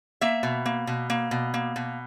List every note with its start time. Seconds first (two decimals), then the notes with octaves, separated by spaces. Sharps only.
0.21 A#3 E5
0.43 B2
0.66 A#3
0.87 B2
1.10 A#3
1.31 B2
1.54 A#3
1.76 B2